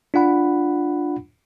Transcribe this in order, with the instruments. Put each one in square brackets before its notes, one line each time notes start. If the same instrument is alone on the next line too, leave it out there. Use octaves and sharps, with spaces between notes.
[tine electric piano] D4 F4 F#5 B5